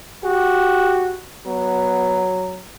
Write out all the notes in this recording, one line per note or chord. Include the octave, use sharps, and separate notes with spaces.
F#4 G4
F#3 B3